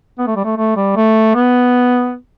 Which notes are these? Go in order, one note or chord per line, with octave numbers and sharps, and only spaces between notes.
B3
A3
G3
A3
A3
G3
A3
B3